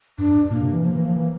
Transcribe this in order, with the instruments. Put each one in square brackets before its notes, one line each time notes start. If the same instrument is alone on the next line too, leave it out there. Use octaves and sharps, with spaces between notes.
[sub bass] G2 [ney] D4
[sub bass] G2
[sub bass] A#2 [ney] A#3
[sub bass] C3
E3
[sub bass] F3 [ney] A#3
[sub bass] E3
F3
E3